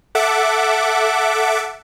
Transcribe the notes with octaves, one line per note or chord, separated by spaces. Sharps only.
A4 E5 F#5 D6